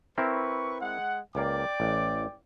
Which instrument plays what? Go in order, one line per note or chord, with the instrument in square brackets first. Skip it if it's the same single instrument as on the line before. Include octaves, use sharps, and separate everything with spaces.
[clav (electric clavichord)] C4 E4 A#4 [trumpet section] B4 C#6
[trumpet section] G#3 F#5
[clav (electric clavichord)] C#2 A#3 [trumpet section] D5 G5 D6
[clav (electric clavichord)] A1